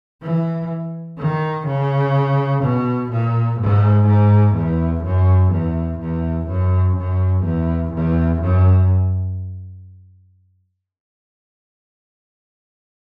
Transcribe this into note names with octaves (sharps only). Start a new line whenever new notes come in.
E3
D#3
C#3
B2
A#2
G#2
G#2
E2
F#2
E2
E2
F#2
F#2
E2
E2
F#2